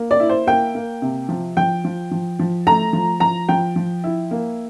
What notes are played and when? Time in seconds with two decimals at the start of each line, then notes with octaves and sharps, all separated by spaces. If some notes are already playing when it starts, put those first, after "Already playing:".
Already playing: A#3
0.11 D5
0.20 E4
0.29 C5
0.47 A#3 G5
0.75 A#3
1.02 C3
1.29 F3
1.57 F3 G5
1.85 F3
2.11 F3
2.39 F3
2.67 A3 A#5
2.93 F3
3.20 F3 A#5
3.49 F3 G5
3.76 F3
4.04 E4
4.31 A#3